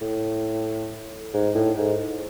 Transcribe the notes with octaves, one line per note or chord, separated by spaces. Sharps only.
A2
G#2
A2
G#2